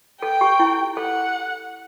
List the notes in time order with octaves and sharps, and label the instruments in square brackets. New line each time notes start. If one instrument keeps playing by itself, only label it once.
[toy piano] A4 [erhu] G5
[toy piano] G4
E4
[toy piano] A4 [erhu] F#5